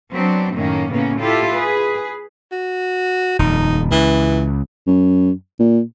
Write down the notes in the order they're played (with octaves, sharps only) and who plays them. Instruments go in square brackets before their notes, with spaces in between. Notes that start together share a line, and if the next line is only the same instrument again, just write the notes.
[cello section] F#3 B3 C4 D4
F#2 A2 D#3 A#3 C#4
A2 C#3 A#3 B3 C#4
E4 F4 G4 A4
G#4 B4
[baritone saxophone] F#4
[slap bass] D#1 F2 [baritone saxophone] D#4
[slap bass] C#2 [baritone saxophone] E3
[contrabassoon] F#2
A#2